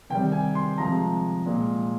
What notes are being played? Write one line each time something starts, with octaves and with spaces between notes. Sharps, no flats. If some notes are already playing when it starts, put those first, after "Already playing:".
C3 D#3 G3 G5
G#5
C6
C3 F3 G#3 A#5
A#2 G#3